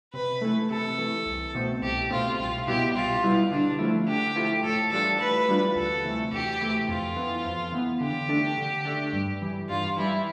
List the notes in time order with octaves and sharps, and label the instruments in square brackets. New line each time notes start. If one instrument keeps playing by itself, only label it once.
[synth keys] C3 [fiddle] B4
[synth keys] E3 A3
[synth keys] C3 [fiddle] A4
[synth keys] E3 A3
C2
B2 A3 C4
[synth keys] C2 [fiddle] G4
[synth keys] B2 A3 C4 [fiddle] F4
[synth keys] C2 [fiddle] F4
[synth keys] B2 G3 B3 E4 [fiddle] G4
[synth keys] C2 [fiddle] F4
[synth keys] B2 G3 B3 E4
[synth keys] D3 [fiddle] D4
[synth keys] F3 A3 E4
[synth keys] D3 [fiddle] G4
[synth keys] F3 A3 E4
[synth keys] A2 [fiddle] A4
[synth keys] E3 G3 D4 F4 [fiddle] A4
[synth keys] A2 [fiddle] B4
[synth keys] E3 G3 D4 F4
[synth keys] D2 [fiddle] A4
[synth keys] C3 E3 A3
[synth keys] D2 [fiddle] G4
[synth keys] C3 E3 A3
[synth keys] F2 [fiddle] F4
[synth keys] E3 B3
F2
E3 B3
[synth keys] D3 [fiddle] G4
[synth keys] A3 D4
D3
A3 D4
G2
E3 G3
[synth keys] G2 [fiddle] F4
[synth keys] E3 G3 [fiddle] E4